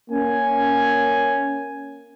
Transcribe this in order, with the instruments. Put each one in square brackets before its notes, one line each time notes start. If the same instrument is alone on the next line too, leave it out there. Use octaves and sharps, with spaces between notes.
[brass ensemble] A#3 C#4 G#5